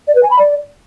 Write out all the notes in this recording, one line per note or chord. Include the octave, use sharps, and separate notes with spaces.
D5
B4
G#5
B5
D5